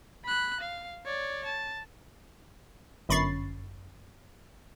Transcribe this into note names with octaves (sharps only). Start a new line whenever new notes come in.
B5 F#6
F5
C#5 D5
A5
G1 F#2 B5 C#6 A6 C7